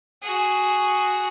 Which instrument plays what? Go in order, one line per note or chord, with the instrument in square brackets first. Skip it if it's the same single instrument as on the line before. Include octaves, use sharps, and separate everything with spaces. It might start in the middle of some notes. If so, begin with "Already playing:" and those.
[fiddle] F#4 G#4